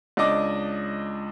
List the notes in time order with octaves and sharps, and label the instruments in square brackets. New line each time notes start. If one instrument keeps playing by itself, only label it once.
[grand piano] C#2 D4 D#5 D6